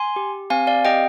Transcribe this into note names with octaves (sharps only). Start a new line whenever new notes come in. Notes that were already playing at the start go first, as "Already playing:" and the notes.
Already playing: G#5 C6
G4
C4 F5 G#5
D5 F5
G4 D#5 G5